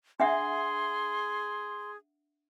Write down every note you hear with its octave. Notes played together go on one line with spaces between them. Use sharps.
D4 G#4 E5 F#5 C6